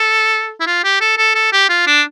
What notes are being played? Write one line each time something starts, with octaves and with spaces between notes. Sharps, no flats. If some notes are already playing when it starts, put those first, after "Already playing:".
Already playing: A4
E4
F4
G4
A4
A4
A4
G4
F4
D4